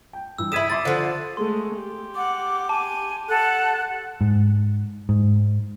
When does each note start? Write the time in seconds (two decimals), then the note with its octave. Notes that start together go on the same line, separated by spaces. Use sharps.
0.13 G5
0.38 G2 E3 E6
0.52 C#3 E4 D#6 G#6 B6 D#7 E7
0.70 B5 C6 D6 A6
0.85 D3 F3
1.37 G#3 A3 C6
1.76 G4
2.15 F#5 D6
2.69 G#5 A5
3.29 A4 F#5 F#6
4.21 G#2
5.09 G#2